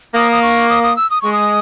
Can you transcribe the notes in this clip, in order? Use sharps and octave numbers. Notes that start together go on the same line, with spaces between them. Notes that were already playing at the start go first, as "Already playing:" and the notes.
A#3 D#6
D#6
C#6
D#6
D#6
E6
D#6
G#3 C#6
D#6